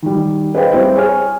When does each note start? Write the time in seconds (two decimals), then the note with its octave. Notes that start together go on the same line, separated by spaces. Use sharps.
0.02 D#3 G3
0.54 G#4 B4 C5 D#5 F5 G5
0.73 G3 C4 E4
0.96 G#4 C#5 G#5 F6